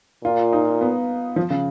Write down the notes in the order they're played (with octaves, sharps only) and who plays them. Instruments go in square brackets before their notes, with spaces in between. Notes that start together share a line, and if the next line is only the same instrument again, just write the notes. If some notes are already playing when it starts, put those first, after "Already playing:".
[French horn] A#2 [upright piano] F4
[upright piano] D#4
B3
F3
C#3